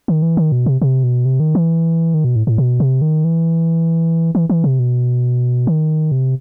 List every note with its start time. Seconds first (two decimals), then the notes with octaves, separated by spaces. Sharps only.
0.08 D#3
0.22 E3
0.37 D#3
0.52 B2
0.66 C3
0.82 C3
1.03 B2
1.25 C3
1.40 D#3
1.55 E3
2.14 D#3
2.24 B2
2.36 A2
2.47 A2
2.58 B2
2.80 C3
3.02 D#3
3.24 E3
4.35 E3
4.50 E3
4.64 C3
4.79 B2
5.67 D#3
6.12 C3